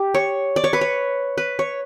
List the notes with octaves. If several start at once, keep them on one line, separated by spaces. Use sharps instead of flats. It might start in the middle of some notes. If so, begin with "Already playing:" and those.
Already playing: G4
C#5
D5
C#5
B4
C#5
B4
C#5